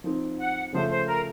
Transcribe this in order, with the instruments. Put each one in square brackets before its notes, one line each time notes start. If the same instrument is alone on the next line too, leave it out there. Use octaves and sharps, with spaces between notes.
[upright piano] F3 C4 D#4
[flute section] F#5
[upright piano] C#3 F3 A3 [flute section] C5
[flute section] C5
A#4